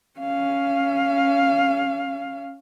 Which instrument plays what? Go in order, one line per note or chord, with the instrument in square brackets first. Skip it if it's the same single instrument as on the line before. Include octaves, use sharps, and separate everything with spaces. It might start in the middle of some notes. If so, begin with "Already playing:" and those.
[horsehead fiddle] C#4 F5